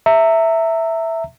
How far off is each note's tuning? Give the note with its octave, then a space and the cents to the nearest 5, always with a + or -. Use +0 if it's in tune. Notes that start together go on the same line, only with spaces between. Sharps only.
E5 +0 A#5 -30